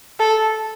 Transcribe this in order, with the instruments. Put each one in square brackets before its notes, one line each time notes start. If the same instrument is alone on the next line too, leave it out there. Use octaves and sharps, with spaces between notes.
[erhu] A4